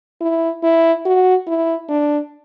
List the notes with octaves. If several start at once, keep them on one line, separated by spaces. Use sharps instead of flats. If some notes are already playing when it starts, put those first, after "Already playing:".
E4
E4
F#4
E4
D4